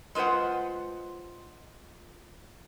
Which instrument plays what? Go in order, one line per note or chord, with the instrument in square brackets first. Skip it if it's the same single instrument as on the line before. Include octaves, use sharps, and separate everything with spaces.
[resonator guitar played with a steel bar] G#3 F4 B4 C5 F#5